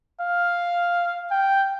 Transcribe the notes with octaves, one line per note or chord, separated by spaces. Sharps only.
F5
G5